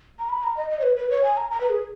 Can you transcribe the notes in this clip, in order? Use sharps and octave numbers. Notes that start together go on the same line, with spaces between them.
A#5
B5
A#5
D#5
D#5
C#5
B4
B4
C#5
G#5
A#5
A#5
B4
G#4